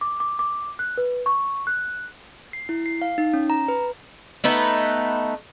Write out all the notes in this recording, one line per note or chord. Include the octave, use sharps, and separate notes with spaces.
D6
D6
D6
F#6
B4
C#6
F#6
C7
E4
C7
F5
D#4
C#4
A#5
B4
A3 B3 D#4 B4